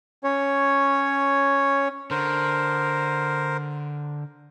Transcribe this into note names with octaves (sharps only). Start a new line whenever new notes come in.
C#4 C#5
D3 A#4 C5